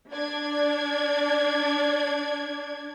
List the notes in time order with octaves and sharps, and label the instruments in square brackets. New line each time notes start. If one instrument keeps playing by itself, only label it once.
[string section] D4 D5 G#6